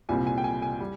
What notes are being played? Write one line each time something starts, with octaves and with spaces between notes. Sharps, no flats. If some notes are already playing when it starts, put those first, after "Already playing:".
C2 A#2 G3 C4 G#5
G#5
G5
G#5
G#5
G3